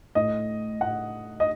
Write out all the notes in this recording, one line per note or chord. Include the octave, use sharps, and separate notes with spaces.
A2 D#5
A2 F#5
D#5